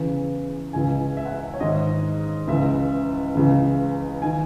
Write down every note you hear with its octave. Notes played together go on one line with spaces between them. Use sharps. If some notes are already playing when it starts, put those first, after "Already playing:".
Already playing: E2 C#3 E3
C#2 C#3 E3 G#5
E5
F#5
E5
C#5
G#2 D#3 D#5
C#2 C#3 E3 E5
C#2 C#3 E3
D#3 G#5